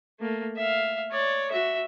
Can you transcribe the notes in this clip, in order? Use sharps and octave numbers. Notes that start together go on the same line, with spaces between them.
A3 A#3
E5 F5
C#5 D5
F#4 E5